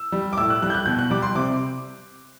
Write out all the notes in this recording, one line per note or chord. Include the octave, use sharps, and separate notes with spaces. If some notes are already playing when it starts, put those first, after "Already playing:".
Already playing: E6
G3
D6
A2 E6
F#6
G3 F#6
G6
F#6
B2 G6
F#6
G3 D6
C6
C3 D6